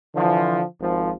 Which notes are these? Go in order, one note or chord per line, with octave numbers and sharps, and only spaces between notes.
D3 E3 F3
G#1 F3